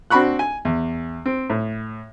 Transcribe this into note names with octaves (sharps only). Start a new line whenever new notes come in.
C4 D4 F#4 B5 C#6 F#6
G#5
E2
C4
A2